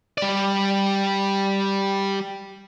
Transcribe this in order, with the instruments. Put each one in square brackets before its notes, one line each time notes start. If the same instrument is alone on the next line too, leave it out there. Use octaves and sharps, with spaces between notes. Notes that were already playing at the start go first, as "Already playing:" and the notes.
[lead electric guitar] G3 D5